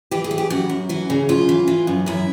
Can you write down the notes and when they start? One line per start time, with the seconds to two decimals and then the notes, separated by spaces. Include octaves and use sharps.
0.11 E3 G4
0.24 G#4
0.31 E3
0.38 G4
0.50 F#2 F#4
0.70 F#2
0.89 E3 F#4
1.10 C#3
1.29 F#2 F4
1.49 E3
1.68 E3
1.87 F#2
2.06 F#2 E4